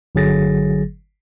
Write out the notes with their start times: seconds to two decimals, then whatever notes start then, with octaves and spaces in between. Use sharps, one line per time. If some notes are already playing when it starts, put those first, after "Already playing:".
0.15 G1 D3 F#3 G#4 A6 A#6